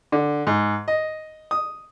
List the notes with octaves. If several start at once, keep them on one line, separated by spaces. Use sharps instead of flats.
D3
G#2
D#5
D#6